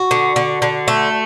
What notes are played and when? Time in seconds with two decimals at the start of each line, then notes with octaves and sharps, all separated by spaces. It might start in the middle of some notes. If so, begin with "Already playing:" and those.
Already playing: F#4
0.11 D3
0.36 D3
0.62 D3
0.88 A3